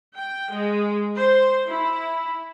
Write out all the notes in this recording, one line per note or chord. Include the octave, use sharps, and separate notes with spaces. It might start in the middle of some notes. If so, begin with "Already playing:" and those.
G5
G#3
C5
E4